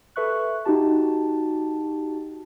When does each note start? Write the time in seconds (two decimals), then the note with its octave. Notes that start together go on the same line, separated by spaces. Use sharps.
0.16 A4 B4 E5 C#6 F#6
0.65 D#4 F#4 G4 A5